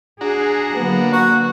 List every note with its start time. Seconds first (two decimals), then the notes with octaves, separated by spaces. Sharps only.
0.21 D4 F#4 G#4 A#5
0.75 D3 F#3 A#3 B3
1.13 F#4